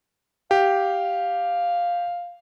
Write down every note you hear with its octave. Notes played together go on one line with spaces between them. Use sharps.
G4 F5